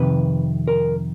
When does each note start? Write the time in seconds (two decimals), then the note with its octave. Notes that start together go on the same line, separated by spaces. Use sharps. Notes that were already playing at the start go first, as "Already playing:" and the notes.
Already playing: F2 C3 D#3 B4
0.68 A#4